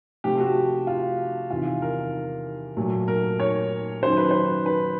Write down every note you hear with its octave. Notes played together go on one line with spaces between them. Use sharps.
C3 F3 A3 G4
F#4
F4
E2 C3 D#3 F4
A#4
A#2 F#3 A3
A#4
C#5
F#2 D#3 F#3 C5
B4
C5
B4